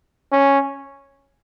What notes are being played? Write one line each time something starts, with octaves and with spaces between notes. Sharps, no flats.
C#4